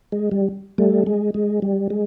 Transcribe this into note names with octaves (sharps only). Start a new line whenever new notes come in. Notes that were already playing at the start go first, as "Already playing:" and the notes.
G#3
G3
G3 A3
G#3
G#3
G3
G#3